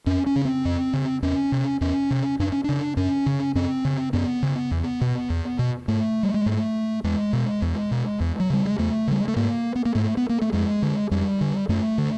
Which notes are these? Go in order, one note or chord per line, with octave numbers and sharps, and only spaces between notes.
F2 C#4
C#4
C#3
C4
F2
C#3
E2 C#4
C3
E2 C#4
C3
F#2 D4
C#4
C#3 D4
F#2 C#4
C#3
F#2 C4
C#3
F#2 B3
C#3
E2
B2
E2
B2
G#2 A3
G3
G#3
G#2 A3
E2 G#3
B2
E2
B2
E2
F#3
C#3 G3
G#3
E2 A3
C#3 G3
G#3
A3
G#2 A#3
B3
A#3
G#2 A3
B3
A#3
A3
F2 G#3
D3
F2 G3
D3
F#2 A3
D3